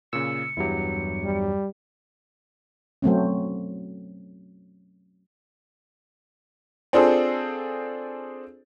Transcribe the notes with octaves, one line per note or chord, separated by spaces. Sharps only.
A#2 C#3 E6 C#7
E2 G2 F#3 E4 G4
G3
F#3 A3 C4 C#4
C4 D4 F4 G#4 A4 C5